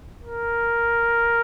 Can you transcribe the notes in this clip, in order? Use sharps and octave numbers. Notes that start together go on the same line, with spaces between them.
A#4